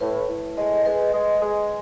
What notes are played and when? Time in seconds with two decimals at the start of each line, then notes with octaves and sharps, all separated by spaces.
0.01 A2 B4
0.28 A2
0.57 G#3 D#5
0.85 G#3 B4
1.14 G#3
1.42 G#3